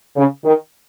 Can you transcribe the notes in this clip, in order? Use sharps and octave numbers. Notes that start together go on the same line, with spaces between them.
C#3
D#3